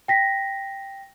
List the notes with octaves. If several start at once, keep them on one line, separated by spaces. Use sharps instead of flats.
G5 A#6 B6